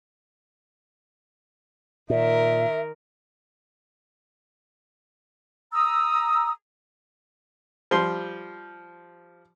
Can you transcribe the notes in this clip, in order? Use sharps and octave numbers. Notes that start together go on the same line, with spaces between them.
A#2 D#3 A#4 E5
A#5 D#6 E6
F3 G3 C6